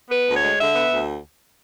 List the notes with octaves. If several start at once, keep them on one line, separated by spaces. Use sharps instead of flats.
B3 B4
D2
C#5
G#3
D3 E5
B3
D2